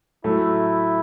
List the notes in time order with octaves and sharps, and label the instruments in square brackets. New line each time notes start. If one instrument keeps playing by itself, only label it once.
[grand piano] A2 F#3 A3 [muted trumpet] E4